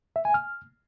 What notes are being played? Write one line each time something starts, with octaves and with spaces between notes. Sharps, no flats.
E5
G#5
F6